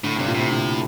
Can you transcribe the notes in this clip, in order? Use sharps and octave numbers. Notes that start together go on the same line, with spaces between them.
A2 D3
G2 C3
A#2
A2 C3
D3